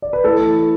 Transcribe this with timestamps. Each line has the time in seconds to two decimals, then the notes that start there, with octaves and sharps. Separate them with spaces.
0.02 D5
0.13 B4
0.24 A3 E4 A4
0.40 E3